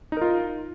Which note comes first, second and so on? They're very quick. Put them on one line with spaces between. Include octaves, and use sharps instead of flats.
D#4 A#4 F4